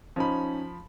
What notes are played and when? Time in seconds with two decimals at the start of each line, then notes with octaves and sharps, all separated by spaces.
0.16 F3 C#4 D#4 B5